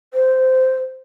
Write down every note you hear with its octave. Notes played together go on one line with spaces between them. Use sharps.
C5